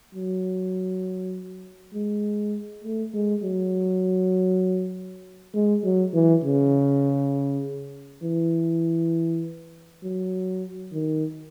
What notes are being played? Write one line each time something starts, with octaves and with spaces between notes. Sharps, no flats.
F#3
G#3
A3
G#3
F#3
G#3
F#3
E3
C#3
E3
F#3
D#3